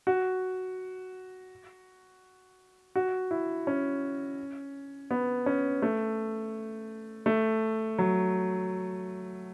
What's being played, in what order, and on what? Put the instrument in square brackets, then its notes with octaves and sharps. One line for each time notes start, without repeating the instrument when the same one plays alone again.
[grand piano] F#4
F#4
E4
C#4
B3
C#4
A3
A3
F#3